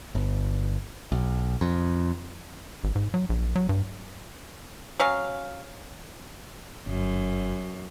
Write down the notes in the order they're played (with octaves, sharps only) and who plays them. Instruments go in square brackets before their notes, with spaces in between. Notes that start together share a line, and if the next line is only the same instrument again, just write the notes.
[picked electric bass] G1
B1
F2
[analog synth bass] G#1
G#2
F#3
A#1
F#3
G2
[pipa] F#3 C#4 F5
[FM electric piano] G1 [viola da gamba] F#2